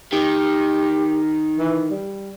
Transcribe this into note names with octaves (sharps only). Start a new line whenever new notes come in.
D#3 G4
E3
G3